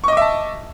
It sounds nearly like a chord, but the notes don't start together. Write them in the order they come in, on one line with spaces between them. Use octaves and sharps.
C#6 D#5 D6 E5 A5